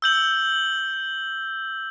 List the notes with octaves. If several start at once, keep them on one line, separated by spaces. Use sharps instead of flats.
E6 G6 F#7